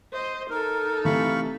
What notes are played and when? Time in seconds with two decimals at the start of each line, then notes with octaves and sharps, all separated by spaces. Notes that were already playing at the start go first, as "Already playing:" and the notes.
0.13 C5 D#5
0.50 D#4 A4 A#4
1.05 C3 E3 A3 F5 B5 C#6